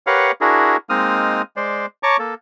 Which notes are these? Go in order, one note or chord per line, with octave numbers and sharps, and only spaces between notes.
G4 A#4 B4 C#5 F5 F#5
D4 E4 F#4 G#4 A#4
G#3 A#3 C4 D#4 D#6 F6
G#3 C5 D5
C#5 A5 A#5 C#6 D6
A#3 A4